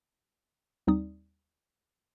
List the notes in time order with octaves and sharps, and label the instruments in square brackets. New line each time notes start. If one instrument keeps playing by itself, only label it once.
[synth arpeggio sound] D#2 G3 C4 D#4 D5 D#6